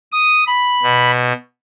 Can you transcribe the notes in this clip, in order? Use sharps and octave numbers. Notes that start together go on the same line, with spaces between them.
D#6
B5
B2